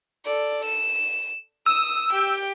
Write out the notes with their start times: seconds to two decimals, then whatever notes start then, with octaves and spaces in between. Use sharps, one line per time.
0.25 A4 D5
0.65 E7
1.66 D#6 E6
2.12 G4 G5